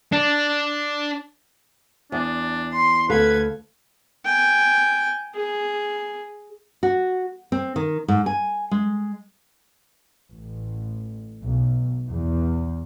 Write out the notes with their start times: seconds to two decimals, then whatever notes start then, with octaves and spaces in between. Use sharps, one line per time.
0.12 D4
2.12 E2 D4
2.74 C6
3.10 D2 A4 B4 F5 G#6
4.25 G5 G#5
5.34 G#4
6.83 F#4
7.52 C4
7.76 D#3
8.08 G#2
8.26 G#5
8.71 G#3
10.31 A1
11.43 B1
12.08 E2